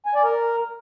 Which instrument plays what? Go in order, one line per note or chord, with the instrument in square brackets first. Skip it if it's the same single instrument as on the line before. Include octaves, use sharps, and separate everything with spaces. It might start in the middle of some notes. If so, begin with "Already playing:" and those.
[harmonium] G#5
D5
A#4